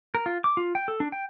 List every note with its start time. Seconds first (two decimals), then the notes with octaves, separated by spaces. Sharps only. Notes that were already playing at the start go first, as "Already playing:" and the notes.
0.15 A#4
0.26 F4
0.44 D6
0.57 F4
0.75 G5
0.88 A4
1.00 D4
1.12 G5